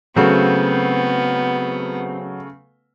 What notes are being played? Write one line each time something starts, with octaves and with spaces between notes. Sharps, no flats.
C#3 F#3 A3 B3 C4